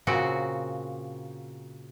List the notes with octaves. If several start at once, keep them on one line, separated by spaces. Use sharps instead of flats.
A#2 C#3 C4 F#4